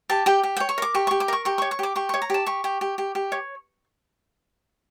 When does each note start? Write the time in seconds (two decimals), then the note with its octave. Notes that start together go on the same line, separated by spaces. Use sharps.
0.10 G4 A5
0.26 G4 G5
0.43 G4
0.57 C#5 G5
0.69 C#6
0.78 A#4 D6
0.95 G4 C#6
1.07 G4 C#6
1.20 D6
1.28 A#4 C#6
1.45 G4 C#6
1.58 C#5 C#6
1.71 C#6
1.79 G4 D6
1.96 G4 C#6
2.09 C#5 C#6
2.22 A#5
2.30 G4 A5
2.46 G4 C#6
2.64 G4
2.81 G4
2.98 G4
3.15 G4
3.32 C#5